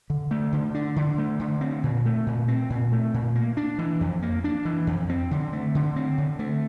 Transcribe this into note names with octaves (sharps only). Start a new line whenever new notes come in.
D3
A3
D3
D4
D3
A3
D3
C4
A#2
A3
A#2
C4
A#2
A3
A#2
A#3
D4
E3
F2
A#3
D4
E3
F2
C4
D3
A3
D3
C4
D3
A3